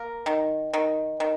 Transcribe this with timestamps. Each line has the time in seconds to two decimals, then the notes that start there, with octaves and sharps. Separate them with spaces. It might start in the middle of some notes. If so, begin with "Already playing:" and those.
Already playing: A#3 A#4
0.26 D#3
0.74 D#3
1.20 D#3